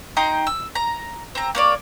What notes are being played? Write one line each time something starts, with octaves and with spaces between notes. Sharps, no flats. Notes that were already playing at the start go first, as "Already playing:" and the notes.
D#4 G5 A#5 C6
E6
A#5
C4 A#5
A#3 C#5 D5